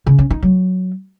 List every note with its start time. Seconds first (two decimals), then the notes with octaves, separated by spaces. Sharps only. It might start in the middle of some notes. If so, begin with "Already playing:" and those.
0.07 C#3
0.18 C#4
0.30 D#4
0.42 F#3